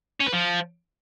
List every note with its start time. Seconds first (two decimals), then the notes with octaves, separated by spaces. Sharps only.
0.21 C#4
0.27 B4
0.33 F3